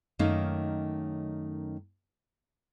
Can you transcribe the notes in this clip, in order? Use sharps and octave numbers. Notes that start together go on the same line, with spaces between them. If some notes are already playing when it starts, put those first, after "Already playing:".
F#2 D#3 A3 A#3 C#4 D#4